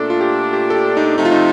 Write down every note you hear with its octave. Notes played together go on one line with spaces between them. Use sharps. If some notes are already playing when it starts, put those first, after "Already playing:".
Already playing: A#2 A3 D4 A4
F4
G4
G4
A4
G4
D#4
C3 F3 A3 D#4
F4
D#4